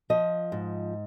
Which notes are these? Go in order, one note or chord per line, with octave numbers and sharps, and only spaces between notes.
F3 D#5
G#2